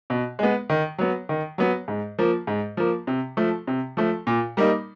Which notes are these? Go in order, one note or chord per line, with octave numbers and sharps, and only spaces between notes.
B2
G#3 B3
D#3
F#3 B3
D#3
F#3 B3
G#2
F3 A#3
G#2
F3 A#3
C3
F3 A3
C3
F3 A3
A#2
G3 A#3 D#4